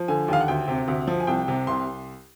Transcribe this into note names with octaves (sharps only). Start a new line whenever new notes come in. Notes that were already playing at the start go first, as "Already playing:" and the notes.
Already playing: F3
D3 G#5
D#2 F5
F#5
D2 G5
C3
D2
F3
G#5
C2 G5
C3
C2 C6